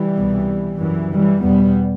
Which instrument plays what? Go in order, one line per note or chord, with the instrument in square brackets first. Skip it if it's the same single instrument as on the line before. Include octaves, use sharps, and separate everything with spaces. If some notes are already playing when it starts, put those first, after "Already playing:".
Already playing: [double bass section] E3 G3
C2 B2
F#2 E3
E3 G3
E2 B2 G3 B3